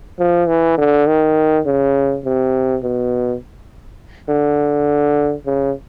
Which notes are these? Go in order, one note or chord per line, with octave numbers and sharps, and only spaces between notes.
F3
E3
D3
D#3
C#3
C3
B2
D3
C#3